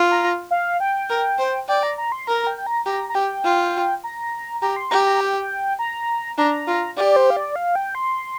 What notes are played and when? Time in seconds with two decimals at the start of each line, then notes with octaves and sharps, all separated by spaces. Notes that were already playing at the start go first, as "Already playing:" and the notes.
Already playing: F4
0.11 A#5
0.51 F5
0.80 G5
1.10 A#4
1.39 C5
1.68 D5 G5
1.83 A#5
1.98 A#5
2.12 C6
2.27 A#4 A#5
2.47 G5
2.58 G5
2.67 A#5
2.86 G4 A#5
3.09 A#5
3.15 G4 G5
3.44 F4
4.04 A#5
4.62 G4 A#5
4.76 C6
4.91 G4 A#5
5.06 A#5
5.21 G5
5.79 A#5
6.38 D4 A#5
6.67 F4
6.97 G4 D5
7.16 C5
7.30 F5
7.37 D5
7.56 F5
7.75 G5
7.95 C6